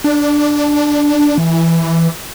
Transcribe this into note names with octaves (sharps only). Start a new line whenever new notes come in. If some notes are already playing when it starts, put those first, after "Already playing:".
D4
E3